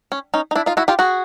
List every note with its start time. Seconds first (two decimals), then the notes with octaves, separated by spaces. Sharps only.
0.12 C#4
0.34 C#4 D#4
0.51 D#4
0.55 D4 E4
0.66 D#4 F4
0.77 E4 F#4
0.88 F4 G4
0.99 F#4 G#4